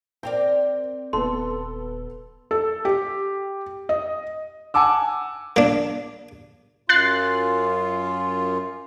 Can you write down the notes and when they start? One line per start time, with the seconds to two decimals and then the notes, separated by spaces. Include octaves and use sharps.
0.23 C4 A#4 D5 G5
1.13 D#1 B3 A4 C6
2.51 A4
2.85 G4
3.89 D#5
4.74 F#5 G#5 A5 D6 E6
5.56 A#3 D4
6.89 F#2 F4 F#6 A6 C7